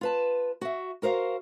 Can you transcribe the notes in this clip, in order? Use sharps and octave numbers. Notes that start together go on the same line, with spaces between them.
F4 B4 A5
F#4 E5
F#4 A#4 C5 D#5 F5